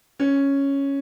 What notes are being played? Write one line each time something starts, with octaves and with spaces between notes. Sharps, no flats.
C#4